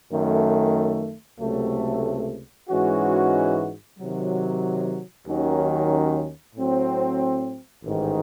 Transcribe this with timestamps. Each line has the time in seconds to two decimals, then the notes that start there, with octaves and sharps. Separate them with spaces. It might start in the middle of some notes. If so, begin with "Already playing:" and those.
0.11 F#2 D#3 A3
1.40 C#2 C3 F#3 A3
2.69 G#2 E3 G#3 C#4 F#4
3.98 C3 D#3 F#3
5.27 D#2 D#3 F#3 C#4
6.56 A2 F#3 C4
7.85 A1 G#2 D#3